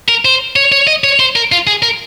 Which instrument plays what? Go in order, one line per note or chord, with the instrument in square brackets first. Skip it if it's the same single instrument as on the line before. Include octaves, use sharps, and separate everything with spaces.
[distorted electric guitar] A#4
C5
C#5
C#5
D#5
C#5
C5
A#4
F4
G#4
A#4